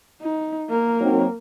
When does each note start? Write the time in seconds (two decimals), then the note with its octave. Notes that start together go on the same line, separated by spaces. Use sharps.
0.21 D#4
0.69 A#3 A#4
1.01 F#3 C4 D#4